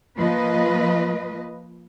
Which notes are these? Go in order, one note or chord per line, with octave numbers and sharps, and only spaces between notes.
F3 A#3 B4 D#5